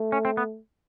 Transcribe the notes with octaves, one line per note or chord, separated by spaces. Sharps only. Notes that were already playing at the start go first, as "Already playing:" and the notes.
Already playing: A3
C#4
C4
B3